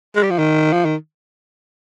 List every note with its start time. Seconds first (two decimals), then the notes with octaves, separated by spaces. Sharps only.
0.16 G#3
0.23 G3
0.31 F3
0.39 D#3
0.73 F3
0.85 D#3